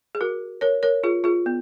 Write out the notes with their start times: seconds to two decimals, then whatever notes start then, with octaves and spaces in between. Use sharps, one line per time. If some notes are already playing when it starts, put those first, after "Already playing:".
0.15 G#4
0.21 F#4 A#4
0.61 A#4 C#5
0.83 A#4 C#5
1.04 F4 G#4
1.24 F4 G#4
1.46 B3